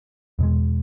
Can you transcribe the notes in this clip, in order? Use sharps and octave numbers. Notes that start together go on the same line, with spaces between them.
E2 B2 G#3